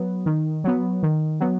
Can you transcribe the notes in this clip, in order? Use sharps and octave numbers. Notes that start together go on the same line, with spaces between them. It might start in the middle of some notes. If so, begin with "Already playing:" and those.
Already playing: F#3 B3
D#3
F#3 B3
D#3
F#3 B3